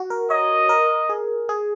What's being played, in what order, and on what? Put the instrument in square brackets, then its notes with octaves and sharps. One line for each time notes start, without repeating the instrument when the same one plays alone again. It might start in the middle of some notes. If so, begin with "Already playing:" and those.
Already playing: [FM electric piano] F#4
A#4
[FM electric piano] C#5 [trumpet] D#5
[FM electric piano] A#4
G#4
G#4